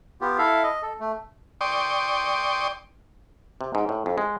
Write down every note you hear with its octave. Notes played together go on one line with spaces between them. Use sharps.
B3 F4 G4
E4 A4 E5 F5
D#5
A4
A3
D5 G5 C6 C#6 D#6
C3
G#2
A2
F2
G#3